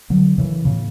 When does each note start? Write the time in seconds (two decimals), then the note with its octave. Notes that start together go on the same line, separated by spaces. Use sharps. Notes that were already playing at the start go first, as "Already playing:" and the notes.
0.10 D3 F#3
0.38 C#3 E3
0.65 A2 C#3